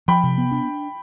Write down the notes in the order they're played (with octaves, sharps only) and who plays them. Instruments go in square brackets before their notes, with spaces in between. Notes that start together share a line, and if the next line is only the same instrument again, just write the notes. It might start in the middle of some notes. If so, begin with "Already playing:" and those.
[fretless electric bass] F3 [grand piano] G5 B5
[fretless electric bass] C3
B3
D4